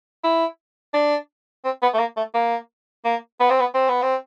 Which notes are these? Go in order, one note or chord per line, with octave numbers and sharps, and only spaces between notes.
E4
D4
C4
B3
A3
A#3
A3
A#3
A#3
B3
C4
B3
C4
B3
C4